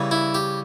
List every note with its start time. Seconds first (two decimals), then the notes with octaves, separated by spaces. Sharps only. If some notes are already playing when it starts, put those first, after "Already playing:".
Already playing: C#3 E3 G3
0.11 E4
0.35 G4